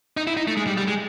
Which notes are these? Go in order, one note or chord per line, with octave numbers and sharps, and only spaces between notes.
D#4
E4
D#4
A3
G#3
G3
G3
G#3